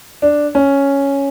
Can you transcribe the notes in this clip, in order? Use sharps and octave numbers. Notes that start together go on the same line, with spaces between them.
D4
C#4